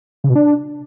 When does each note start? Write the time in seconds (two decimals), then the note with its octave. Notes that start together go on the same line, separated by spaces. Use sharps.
0.24 C#3
0.30 B2
0.35 D4